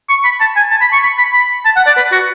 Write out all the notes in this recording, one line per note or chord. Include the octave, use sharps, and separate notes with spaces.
C#6
B5
A5
G#5
A5
B5
C#6
B5
B5
B5
A5
F#5
D5
B4
F#4